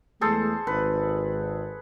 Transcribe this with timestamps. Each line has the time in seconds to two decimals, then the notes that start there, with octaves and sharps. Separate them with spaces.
0.21 E2 G#3 A3 G#4 A4 C5
0.67 G#1 B4